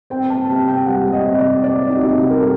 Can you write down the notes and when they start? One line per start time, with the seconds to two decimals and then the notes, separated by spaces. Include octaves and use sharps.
0.10 C4 G5
0.30 A5
0.49 C3
0.68 G5
0.86 G3 F#5
1.12 D#5
1.25 C3
1.39 D5
1.64 C4 D5
1.89 D#4
1.97 F#4
2.02 C3 D#4
2.14 G4
2.30 A#4
2.39 G3 A4